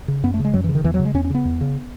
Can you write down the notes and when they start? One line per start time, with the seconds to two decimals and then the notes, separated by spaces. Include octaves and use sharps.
0.08 C#3
0.23 F#2 B3
0.34 A3
0.40 C#3
0.45 G#3
0.54 F#2 F#3
0.64 E3
0.69 C#3
0.75 D#3
0.84 E2 E3
0.94 F#3
0.99 C#3
1.05 G#3
1.14 E2 C#4
1.25 C#4
1.30 C#3 B3
1.45 E2
1.61 C#3